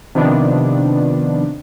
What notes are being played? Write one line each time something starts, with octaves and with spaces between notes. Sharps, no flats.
C3 D#3 F3 B3 D4